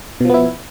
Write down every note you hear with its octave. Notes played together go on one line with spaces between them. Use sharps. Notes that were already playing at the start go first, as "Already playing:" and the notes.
B2 F3 B3 E4